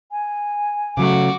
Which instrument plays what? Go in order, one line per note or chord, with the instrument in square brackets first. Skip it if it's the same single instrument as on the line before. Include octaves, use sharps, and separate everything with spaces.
[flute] G#5
[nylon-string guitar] C#3 F#3 A3 [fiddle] F#4 D6